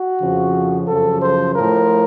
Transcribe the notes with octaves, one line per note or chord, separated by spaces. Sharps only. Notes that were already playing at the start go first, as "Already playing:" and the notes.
Already playing: F#4
F2 C#3 F3
F#2 C#3 F3 A4
C5
A2 F3 A#4